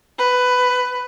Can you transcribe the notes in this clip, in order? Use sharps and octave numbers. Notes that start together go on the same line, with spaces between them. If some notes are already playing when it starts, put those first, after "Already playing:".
B4